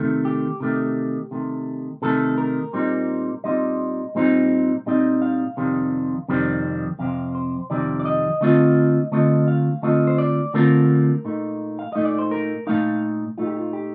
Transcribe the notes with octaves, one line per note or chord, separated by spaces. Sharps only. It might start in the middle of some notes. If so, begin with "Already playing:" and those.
Already playing: C3 D#3 A3
G4
C3 D#3 A3
C3 D#3 A3
C3 D#3 A3 A4
A#4
A#2 G3 C4 D#4
A#2 G3 C4 D#4 D#5
A#2 G3 C4 D#4
A#2 G3 C4 D#4 D#5
F5
F2 C3 D#3 G3 C4
F2 C3 D#3 G3 C4
F2 C3 C4 F5
C5
F2 C3 D#3 G3 C4 D5
D5
D#5
D3 A3 C4 F4 D#5
D3 A3 C4 F4 D#5
F5
D3 A3 C4 F4 D#5
C5
D5
D3 A3 C4 F4 A#4
A#2 A3 D#4
F5
A#2 A3 D#4 D#5
D5
C5
A#4
A#2 A3 D#4 F5
A#2 A3 D#4 F4
G4
F4
G4